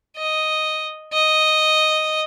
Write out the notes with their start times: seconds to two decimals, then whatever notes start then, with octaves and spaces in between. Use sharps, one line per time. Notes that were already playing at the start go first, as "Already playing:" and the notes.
0.17 D#5
1.13 D#5